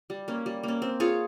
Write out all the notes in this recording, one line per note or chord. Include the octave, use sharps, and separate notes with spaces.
G3
A#3 C#4
G3
A#3 C#4
C4
F4 G#4 C#5